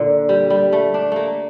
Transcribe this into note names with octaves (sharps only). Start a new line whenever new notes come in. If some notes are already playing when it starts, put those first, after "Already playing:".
Already playing: A#2 D3
G3
G3
A3
D4
A3 A#3